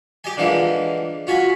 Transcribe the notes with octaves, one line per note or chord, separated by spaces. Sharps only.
G4 D#5 G#5
D3 E3 F3 G#3 A#3
F4 F#4 G#5 B5